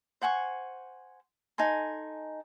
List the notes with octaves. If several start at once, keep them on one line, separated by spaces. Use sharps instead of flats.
C5 F#5 G#5 C#6
D#4 A4 G#5 C6